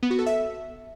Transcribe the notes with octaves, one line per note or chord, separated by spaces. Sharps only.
B3
F#4
A4
E5